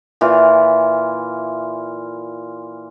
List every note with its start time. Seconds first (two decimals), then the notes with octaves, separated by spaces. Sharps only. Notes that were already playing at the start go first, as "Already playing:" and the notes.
0.21 A#2 E3 F4